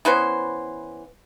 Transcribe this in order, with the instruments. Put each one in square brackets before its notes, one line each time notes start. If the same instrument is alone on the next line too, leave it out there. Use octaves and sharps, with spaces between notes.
[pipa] E3 B3 C#4 C5